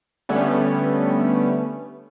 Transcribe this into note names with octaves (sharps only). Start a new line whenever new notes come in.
D3 G3 A3 B3 C#4